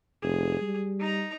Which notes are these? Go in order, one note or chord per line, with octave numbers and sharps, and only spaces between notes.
F1 G#4
G3
D#4 A#5